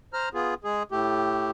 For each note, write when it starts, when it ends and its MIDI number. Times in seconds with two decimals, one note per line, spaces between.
0.13 0.29 72
0.13 0.29 82
0.13 0.29 89
0.34 0.54 59
0.34 0.54 65
0.34 0.54 68
0.64 0.83 56
0.64 0.83 68
0.92 1.51 45
0.92 1.51 57
0.92 1.51 67